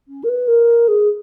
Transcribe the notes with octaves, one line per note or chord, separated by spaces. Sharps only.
C#4
A#4
B4
A#4
G#4